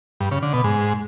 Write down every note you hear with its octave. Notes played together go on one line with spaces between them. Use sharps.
G2
C#3
D3
B2
G#2